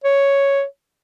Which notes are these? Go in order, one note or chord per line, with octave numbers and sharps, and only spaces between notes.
C#5